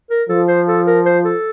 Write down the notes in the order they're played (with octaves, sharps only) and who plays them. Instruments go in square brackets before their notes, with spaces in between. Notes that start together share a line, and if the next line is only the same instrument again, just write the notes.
[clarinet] A#4
[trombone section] F3 [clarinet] A4
[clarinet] C5
A4
A#4
C5
A4